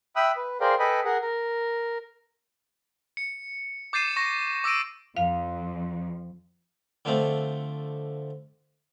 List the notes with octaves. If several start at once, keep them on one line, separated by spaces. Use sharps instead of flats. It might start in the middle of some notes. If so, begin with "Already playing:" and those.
E5 G5 B5 D#6 E6 F#6
B4
G#4 A#4 C5 D5 F5 G5
A4 B4 D#5 G5 G#5 B5
G#4 A#4 F#5
A#4
C#7
D6 G6 A6 C7 D#7 E7
C#6 A#6
D6 E6 A#6 D7 D#7
F2 F5
D3 F3 A3 C4